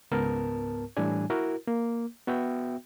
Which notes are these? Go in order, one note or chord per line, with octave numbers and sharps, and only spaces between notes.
C#2 G#2 B3 A#4 A5
A2 E3 G3 D4 G#5
E4 F#4 A#4
A#3
B3 F#4 E5 G5